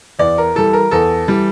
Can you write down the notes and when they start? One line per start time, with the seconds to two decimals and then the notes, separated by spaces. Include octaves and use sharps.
0.19 E2 D5
0.38 A#4
0.55 E3 G3 A4
0.73 A#4
0.91 E2 A4
1.28 E3 G3